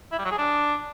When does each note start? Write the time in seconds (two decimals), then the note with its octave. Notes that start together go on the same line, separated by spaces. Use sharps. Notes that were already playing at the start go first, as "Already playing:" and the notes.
0.12 E4
0.18 G3
0.25 F#3
0.31 G#4
0.38 D4